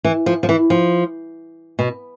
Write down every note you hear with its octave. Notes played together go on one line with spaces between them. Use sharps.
E3
F3
F3
E3
F3
B2